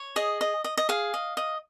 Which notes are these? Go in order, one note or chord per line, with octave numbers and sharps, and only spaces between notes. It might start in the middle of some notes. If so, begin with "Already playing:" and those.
Already playing: C#5
G#4 D#5
D#5
D#5
D#5
G#4 F5
D#5
D#5